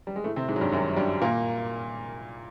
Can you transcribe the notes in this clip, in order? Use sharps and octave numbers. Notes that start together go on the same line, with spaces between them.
G3
G#3
A2 A3
C3 C4
G#2 G#3
F#3
G2 G3
F#2 F#3
G2 G3
A#2 A#3